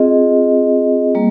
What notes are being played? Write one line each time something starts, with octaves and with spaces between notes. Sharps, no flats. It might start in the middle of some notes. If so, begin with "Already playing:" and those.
Already playing: C4 F4 G#4 D#5
G3 A#3